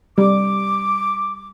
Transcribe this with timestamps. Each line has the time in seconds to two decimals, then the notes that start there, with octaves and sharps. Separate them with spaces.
0.18 G3 D6